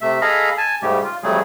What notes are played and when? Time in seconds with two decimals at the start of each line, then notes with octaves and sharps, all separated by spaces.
0.01 C3 A3 E5
0.21 G#4 A4 D#5 F5 A#5 B5
0.58 G#5 A5
0.82 G#2 C#3 G3 A3 G4
1.04 F4
1.23 F2 C#3 F#3 G3 A3 G#4